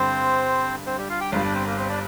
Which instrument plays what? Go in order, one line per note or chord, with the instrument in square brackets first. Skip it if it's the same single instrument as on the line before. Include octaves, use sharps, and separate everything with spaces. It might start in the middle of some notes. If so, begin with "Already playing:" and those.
Already playing: [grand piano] G2 D3 G3 [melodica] C4 C5
[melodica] C4 C5
G3 G4
F4 F5
G4 G5
[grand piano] G1 G2 G3 [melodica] F4 F5
[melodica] D4 D5
C4 C5
A#3 A#4
C4 C5
D4 D5